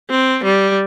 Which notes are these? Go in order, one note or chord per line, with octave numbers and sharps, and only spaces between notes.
C4
G3